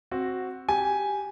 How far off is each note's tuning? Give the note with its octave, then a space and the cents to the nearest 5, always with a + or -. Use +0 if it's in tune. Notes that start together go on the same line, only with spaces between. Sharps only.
C4 +10 F#4 +0
G4 +0 G#5 +0